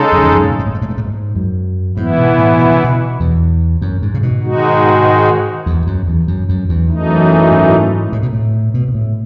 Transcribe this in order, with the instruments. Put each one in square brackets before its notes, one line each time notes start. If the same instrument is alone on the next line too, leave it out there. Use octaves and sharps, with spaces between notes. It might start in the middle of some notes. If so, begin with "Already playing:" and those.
Already playing: [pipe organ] C#3 G#3 D#4 A4
[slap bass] F#2
E2
F#2
G#2
A2
G#2
A2
G#2
A2
G#2
A2
G#2
F#2
[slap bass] G#2 [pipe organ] E3 B3 E4
[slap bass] B2
A2
B2
C#3
B2
E2
F#2
G#2
C#3
B2
[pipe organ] G#2 D#3 G#3 D#4 F#4
[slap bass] E2
F#2
E2
F#2
F#2
E2
[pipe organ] F#2 E3 A3 D#4
[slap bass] G#2
A2
B2
A2
B2
B2
A2